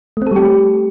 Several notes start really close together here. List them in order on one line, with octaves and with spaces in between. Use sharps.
A3 C4 A4 G3 G4